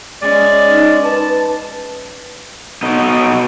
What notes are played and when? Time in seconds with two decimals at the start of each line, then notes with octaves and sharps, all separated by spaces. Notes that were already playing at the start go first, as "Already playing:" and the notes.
0.21 G#3 C#4 D5
0.69 D#4
1.04 B4 A5
2.83 B2 B3 D#4